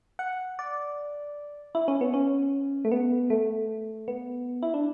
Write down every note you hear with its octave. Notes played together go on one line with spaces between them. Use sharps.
F#5
D5
E4
C#4
B3
C#4
A3
B3
A3
B3
E4
D4